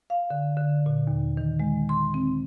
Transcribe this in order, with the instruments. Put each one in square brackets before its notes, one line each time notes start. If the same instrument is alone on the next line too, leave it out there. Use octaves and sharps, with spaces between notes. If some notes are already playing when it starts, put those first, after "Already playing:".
[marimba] F5
D3
D3
A#2
D#2
D#3
G#3
C6
C4